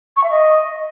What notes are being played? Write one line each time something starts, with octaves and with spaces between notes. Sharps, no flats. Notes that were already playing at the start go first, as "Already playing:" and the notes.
C#6
E5
D#5